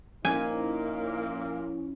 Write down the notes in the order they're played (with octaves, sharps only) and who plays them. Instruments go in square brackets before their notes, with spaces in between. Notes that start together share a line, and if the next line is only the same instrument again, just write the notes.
[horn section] A#2 A#3 [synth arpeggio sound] F3 C#4 E4 [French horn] D#4 [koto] G#5